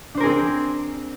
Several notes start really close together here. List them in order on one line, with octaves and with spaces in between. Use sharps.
D4 C5 A#4 G#4 C4